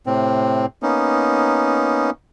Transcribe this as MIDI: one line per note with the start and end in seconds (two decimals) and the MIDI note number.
0.07 0.66 45
0.07 0.66 48
0.07 0.66 60
0.83 2.10 58
0.83 2.10 59
0.83 2.10 61
0.83 2.10 63